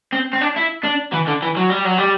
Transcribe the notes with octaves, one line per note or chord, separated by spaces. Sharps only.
C4
C4
D4
E4
D4
E3
D3
E3
F#3
G3
F#3
G3